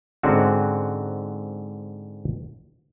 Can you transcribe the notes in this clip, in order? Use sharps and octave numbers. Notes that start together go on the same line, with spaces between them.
G#2 D3 C4 C#4 F#4